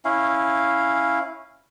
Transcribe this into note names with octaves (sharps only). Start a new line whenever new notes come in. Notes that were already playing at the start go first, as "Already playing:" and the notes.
C#4 E4 F5